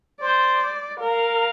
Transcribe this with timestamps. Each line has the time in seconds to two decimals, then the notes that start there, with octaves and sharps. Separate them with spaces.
0.21 C5 D5
0.99 A#4 F5